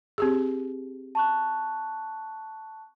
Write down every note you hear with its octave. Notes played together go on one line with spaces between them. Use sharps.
C4 G4 G#4
A5 C#6 F#6